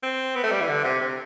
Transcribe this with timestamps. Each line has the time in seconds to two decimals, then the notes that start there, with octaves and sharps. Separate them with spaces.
0.03 C4
0.36 B3
0.44 A3
0.52 G3
0.61 E3
0.68 D3
0.84 C3
1.01 C3